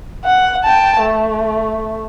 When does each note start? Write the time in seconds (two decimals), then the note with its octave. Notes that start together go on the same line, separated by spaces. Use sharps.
0.25 F#5
0.64 G5 A5
1.01 A3